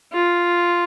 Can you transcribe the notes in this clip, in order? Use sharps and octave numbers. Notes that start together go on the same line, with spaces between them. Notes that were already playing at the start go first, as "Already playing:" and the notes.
F4